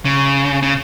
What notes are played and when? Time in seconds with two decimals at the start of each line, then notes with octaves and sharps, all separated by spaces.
0.05 C#3
0.63 C#3